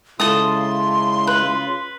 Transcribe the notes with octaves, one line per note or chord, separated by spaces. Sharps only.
C#3 G#3 E4 F4 A4 A5 C6 D#6
B4